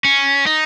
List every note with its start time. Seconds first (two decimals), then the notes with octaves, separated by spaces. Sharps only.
0.05 C#4
0.46 D#4